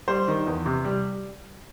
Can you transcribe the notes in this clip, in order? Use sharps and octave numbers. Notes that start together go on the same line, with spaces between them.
G3 C5
D#3
E2
C3
G3